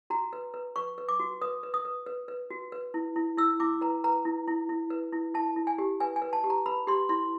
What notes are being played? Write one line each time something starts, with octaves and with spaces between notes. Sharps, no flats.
F#4 A#5
B4
B4
B4 C#6
B4
D6
F#4
B4 D#6
B4
D#6
B4
B4
B4
F#4
B4
E4
E4
E4 E6
E4 D6
B4 A#5
B4 A#5
E4
E4
E4
B4
E4
E4 A5
E4
G#5
G4
B4 G#5
G#5
B4
A5
G4
A#5
B4 B5
G4 C6
E4 C6